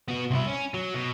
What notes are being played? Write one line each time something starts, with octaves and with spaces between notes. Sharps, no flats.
B3 F#4
C2 E4
C#4
F#3
B2